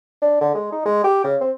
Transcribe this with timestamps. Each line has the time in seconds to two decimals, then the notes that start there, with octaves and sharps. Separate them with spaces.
0.22 D4
0.41 D3
0.55 G#3
0.72 D#4
0.86 G#3
1.04 G4
1.24 C#3
1.41 C4